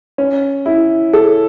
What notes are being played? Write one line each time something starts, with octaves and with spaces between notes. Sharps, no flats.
C#4
E4
A4